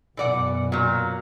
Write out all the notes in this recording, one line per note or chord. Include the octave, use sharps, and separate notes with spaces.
F#2 B2 E3 D5 F#5
A#2 F#3